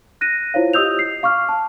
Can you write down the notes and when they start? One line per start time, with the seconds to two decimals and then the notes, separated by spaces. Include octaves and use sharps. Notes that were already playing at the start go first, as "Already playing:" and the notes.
0.21 F#6 A#6 D#7
0.54 E4 F4 C5 C#5 F5
0.73 G4 D#5 D#6 E6 G6 F7
0.99 C7
1.23 F5 C#6 D6 F6
1.49 A5